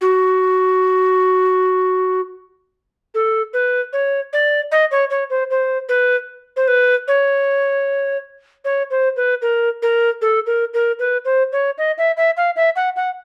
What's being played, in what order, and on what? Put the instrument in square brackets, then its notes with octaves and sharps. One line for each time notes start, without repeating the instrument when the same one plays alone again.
[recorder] F#4
A4
B4
C#5
D5
D#5
C#5
C#5
C5
C5
B4
C5
B4
C#5
C#5
C5
B4
A#4
A#4
A4
A#4
A#4
B4
C5
C#5
D#5
E5
E5
F5
E5
F#5
F#5